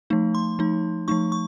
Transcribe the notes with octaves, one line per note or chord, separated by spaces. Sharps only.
F3 A3 D#4
C6
F3 A3 D#4
F3 A3 D#4 C#6
C#6